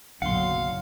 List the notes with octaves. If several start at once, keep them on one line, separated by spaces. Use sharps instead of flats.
F#1 B1 A#2 D3 F#3 F5 F#5 C6